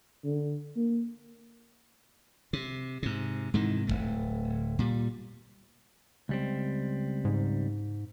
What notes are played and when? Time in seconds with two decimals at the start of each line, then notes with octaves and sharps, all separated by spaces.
0.24 D3
0.77 A#3
2.53 C3
3.03 G#2 C3
3.54 G#2 C3 D#3 E3
3.87 D1 D#2 A3
4.79 A#2 G3
6.29 C#2 G3 C4
7.25 G#2